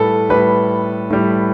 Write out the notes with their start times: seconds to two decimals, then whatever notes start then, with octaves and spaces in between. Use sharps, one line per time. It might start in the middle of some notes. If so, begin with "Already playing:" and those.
Already playing: A2 G3 A4 B4
0.30 A2 G3 B4
1.10 A2 G3